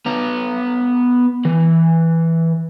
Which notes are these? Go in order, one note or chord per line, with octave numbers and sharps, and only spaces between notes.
B3 A#5
E3